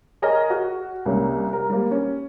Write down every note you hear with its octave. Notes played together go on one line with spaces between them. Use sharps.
G#4 A#4 C#5 D#5 F6
F#4
C2 A#3 C#4
A#4
G3 A#3
C#4